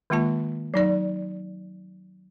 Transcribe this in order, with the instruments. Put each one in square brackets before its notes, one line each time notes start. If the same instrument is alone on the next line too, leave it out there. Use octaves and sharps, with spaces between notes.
[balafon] D#3 G#3 A#3 F4 A5
F#3 D#4 D5